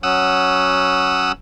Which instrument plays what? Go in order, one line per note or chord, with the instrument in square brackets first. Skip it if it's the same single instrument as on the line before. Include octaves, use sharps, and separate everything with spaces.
[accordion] F#3 C#4 [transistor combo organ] F#5 D#6 E6